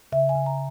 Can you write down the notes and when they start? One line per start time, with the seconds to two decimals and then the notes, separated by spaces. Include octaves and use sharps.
0.12 C#3 E5
0.29 G#5
0.35 C#3
0.46 A#5